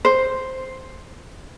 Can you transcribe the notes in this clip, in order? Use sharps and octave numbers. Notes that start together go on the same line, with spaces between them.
C5